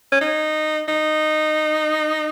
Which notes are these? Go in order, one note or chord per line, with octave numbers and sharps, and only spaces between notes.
C#4
D#4
D#4